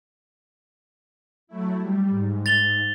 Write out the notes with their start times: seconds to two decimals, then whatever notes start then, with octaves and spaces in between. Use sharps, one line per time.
1.47 F#3 A3 E4
1.78 G3
2.09 G#2
2.46 A6 F7 G7